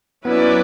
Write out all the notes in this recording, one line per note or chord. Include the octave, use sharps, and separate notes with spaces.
F#3 B3 C#4 E4 B4 D5